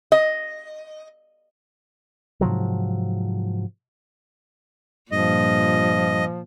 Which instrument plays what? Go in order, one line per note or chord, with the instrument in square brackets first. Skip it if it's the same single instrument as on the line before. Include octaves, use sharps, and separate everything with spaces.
[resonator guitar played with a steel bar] D#5
[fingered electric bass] G#2 C3 F3 F#3
[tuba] G2 [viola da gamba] A#2 [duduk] F3 [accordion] D#5